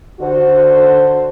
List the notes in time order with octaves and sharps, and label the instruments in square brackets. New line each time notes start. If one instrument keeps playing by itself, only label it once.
[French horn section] D3 F#4 C5